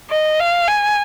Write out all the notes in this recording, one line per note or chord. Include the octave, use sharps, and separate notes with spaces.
D#5
F5
G#5